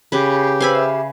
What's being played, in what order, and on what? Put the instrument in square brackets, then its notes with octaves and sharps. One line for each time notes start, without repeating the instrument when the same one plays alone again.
[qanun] C#3 B4 [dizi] G4
[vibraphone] B4 C5 E6 [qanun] F5 G#5 B5
[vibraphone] E5